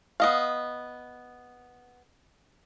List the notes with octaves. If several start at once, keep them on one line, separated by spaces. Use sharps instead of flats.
B3 D#5 F5